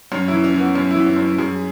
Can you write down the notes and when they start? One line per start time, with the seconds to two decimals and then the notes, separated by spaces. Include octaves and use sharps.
0.12 F#2 C#4
0.28 E3 E4
0.44 C#4
0.54 E3
0.60 B3
0.75 F#2 C#4
0.91 E4
0.96 E3
1.06 C#4
1.17 F#2
1.22 C#4
1.39 F#2 G#4